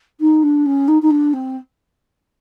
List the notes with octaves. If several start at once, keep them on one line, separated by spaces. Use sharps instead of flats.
D#4
D4
C#4
D#4
D#4
D4
C4